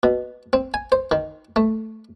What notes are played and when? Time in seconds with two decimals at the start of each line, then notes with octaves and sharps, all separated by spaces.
0.03 B2
0.53 C4
0.74 G#5
0.92 C5
1.11 D#3
1.56 A3